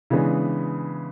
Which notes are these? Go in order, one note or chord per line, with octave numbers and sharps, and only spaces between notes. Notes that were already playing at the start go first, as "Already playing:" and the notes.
C#3 E3 G#3 B3 D4